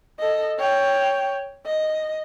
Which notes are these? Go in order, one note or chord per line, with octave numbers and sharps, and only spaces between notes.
A4 D#5
C#5 G5
D#5